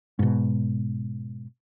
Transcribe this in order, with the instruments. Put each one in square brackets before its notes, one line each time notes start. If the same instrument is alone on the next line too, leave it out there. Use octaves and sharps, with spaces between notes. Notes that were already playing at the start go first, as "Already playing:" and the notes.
[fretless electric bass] G#2 B2